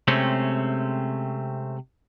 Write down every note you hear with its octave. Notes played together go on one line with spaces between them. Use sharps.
C3 G#3 A3 C4 C#4